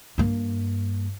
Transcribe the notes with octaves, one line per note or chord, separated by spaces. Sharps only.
G2 A#3